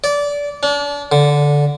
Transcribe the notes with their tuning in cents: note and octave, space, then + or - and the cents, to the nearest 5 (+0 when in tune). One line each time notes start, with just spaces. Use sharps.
D5 -20
D4 -35
D3 -10